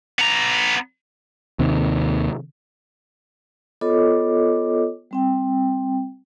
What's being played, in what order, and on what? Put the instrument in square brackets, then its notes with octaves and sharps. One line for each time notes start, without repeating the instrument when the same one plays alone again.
[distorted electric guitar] B3 A#5
[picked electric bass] D#2 C3 D#3
[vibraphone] B3 F4 A4 C#5 D#5 D6
G3 C4 G5